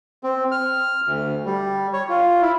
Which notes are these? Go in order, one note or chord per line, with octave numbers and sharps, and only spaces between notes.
C4
F6
D2
G3
C#5
F4
E4